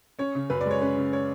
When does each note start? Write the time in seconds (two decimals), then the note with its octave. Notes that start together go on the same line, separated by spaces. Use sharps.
0.19 C#4 C#5
0.35 C#3
0.50 F#2 B4
0.61 D5
0.66 G#3
0.71 C#5
0.81 C#4 B4
0.97 C#3
1.13 C#5